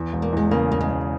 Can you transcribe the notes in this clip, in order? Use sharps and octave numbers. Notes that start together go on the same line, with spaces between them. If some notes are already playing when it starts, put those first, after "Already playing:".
Already playing: E2
E1
A#3
E2 G#3
C#3 A#3
E1 A#3
G#3
E1